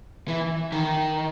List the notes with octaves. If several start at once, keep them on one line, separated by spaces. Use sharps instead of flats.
E3
D#3